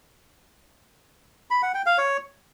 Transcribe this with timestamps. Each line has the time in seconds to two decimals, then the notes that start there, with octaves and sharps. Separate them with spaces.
1.51 B5
1.62 F#5
1.74 G5
1.86 F5
1.98 C#5